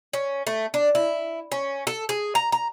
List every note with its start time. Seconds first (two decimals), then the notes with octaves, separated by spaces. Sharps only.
0.13 C#4
0.47 A3
0.74 D4
0.95 E4
1.52 C#4
1.87 A4
2.09 G#4
2.35 A#5
2.52 A#5